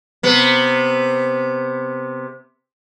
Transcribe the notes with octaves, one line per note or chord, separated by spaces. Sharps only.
C3 B3